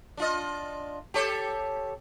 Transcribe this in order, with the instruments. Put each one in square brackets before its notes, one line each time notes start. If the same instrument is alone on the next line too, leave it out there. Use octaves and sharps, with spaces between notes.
[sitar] D4 F4 D#5
G4 A4 C#5